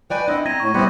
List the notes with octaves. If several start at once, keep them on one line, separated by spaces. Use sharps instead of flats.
B4 C#5 D5 G5 G#5
C4 D4 E4 D#5 F#5
C4 A#5 G#6 A#6 D#7
A2 C#6
C3 G3 B3 C4 C5 F#5 B5 D6